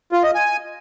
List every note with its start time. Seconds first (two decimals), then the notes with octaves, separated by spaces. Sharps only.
0.12 F4
0.24 D#5
0.35 G#5